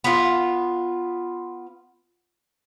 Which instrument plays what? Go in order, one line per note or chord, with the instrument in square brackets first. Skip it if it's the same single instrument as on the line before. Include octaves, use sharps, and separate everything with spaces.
[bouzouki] B3 F4